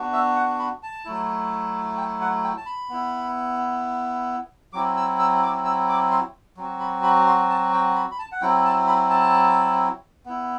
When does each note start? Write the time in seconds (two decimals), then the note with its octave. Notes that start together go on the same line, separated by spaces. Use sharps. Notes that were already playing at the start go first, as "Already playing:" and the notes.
Already playing: B3 D4 F#4
0.13 E5
0.36 F#5
0.59 B5
0.83 A5
1.05 F#3 A3 E4
1.97 G5
2.21 F#5
2.44 G5
2.57 A5
2.66 B5
2.90 B3 E4
4.73 F#3 C4 E4 D6
4.97 E6
5.19 E6
5.43 D6
5.65 E6
5.89 D6
6.11 C6
6.57 F#3 C4 F#4
6.80 B5
7.03 B5
7.27 C6
7.50 A5
7.73 G5
7.95 B5
8.11 B5
8.19 A5
8.32 F#5
8.42 F#3 C4 E4 G5
8.65 A5
8.87 B5
9.10 A5
10.26 B3 E4